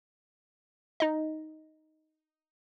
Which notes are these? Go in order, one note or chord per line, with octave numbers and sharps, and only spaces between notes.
D#4 D#5